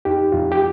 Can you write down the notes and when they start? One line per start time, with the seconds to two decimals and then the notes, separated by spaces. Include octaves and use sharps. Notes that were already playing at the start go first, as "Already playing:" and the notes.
0.05 F2 D#4 G4
0.32 F2 F4
0.52 G4